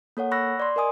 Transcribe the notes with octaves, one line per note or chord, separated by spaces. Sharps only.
A#3 A4 C#5 F#5
B5 C#6 E6 F#6 A#6
D5 C6
A#4 D#5 G#5 D#6